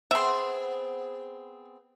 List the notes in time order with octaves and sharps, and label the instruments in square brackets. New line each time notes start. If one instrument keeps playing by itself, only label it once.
[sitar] B3 C4 G#4 [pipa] E5 C6